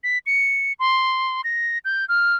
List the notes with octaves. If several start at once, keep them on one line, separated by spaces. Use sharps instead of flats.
B6
C#7
C6
A#6
G6
F6